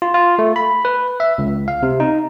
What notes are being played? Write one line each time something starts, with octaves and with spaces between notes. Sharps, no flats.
F4
F4
A3
B5
B4
E5
C#2
F5
C3
D#4